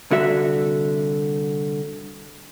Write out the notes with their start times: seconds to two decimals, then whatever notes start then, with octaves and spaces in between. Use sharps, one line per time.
0.11 C2 D3 F#4 E5